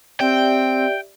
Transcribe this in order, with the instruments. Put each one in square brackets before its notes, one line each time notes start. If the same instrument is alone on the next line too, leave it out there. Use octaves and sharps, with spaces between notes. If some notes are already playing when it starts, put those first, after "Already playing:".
[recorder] C4 [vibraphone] G4 D5 E5 [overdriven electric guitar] G5